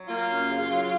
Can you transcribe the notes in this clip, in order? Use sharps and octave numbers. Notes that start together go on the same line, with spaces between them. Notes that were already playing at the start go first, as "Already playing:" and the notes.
Already playing: F#3
A#3 F4
F#2
C#3
F#3